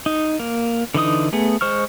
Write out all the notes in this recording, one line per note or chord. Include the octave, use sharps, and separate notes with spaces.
D#4
A#3
D3 E3 D#4 D#6
A3 B3 G#4
G#3 C5 C#6 F6